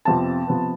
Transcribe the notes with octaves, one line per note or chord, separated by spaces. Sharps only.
F2 C3 F3 B3 A5
C3 F3 B3